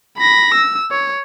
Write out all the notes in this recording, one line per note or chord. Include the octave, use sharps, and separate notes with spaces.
B5 A#6
E6
C#5